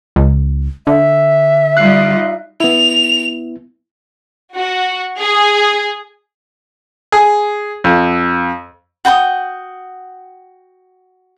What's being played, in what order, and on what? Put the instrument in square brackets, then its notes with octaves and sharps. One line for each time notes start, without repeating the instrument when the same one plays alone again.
[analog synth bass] C#2
[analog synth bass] D3 [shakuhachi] E5
[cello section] G3 D#4 F4 [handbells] F#6 C7
[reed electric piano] B3 E4 [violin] F7
[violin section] F#4
G#4
[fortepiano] G#4
F2
[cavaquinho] F#4 G5 A#5 D#6